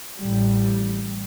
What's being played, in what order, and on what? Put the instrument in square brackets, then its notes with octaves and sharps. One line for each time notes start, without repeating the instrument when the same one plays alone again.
[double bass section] A1 A2 G3